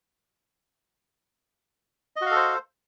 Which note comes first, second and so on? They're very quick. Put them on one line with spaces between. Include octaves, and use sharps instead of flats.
D#5 F#4 F5 A4 C5